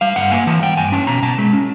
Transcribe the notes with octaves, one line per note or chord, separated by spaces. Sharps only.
G3 F5
G2 F#5
A#3 G#5
E3 A5
G3 G5
G2 G#5
C#4 A5
B2 A#5
B2 A5
G#3
C#4